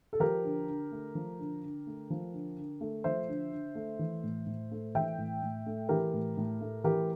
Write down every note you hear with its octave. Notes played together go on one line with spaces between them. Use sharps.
A4
F3 G4 A#4
D3
D3
A3
F3
D3
D3
A3
F3
D3
D3
A3
F3 C5 E5
D3
D3
A3
E3
A2
A2
A3
E3 E5 G5
A2
A2
A3
E3 G4 A#4
A2
A2
A3
E3 G4 A#4